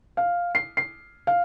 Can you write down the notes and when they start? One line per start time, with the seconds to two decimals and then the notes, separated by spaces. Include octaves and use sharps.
0.17 F5
0.55 C7
0.77 C7
1.27 F5